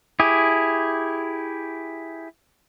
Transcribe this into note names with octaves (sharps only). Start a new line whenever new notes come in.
E4 G4 G#4